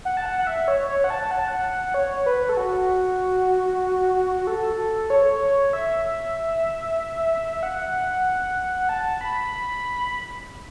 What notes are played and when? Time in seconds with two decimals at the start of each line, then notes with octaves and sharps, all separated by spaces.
0.05 F#5
0.17 A5
0.26 F#5
0.39 F#5
0.47 E5
0.68 C#5
0.89 C#5
1.04 F#5
1.10 A5
1.31 F#5
1.39 A5
1.48 F#5
1.94 C#5
2.26 B4
2.49 A4
2.57 F#4
4.47 A4
5.10 C#5
5.73 E5
7.63 F#5
8.89 A5
9.21 B5